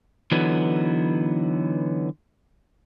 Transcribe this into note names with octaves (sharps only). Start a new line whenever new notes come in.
D3 E3 F#3 B3 D#4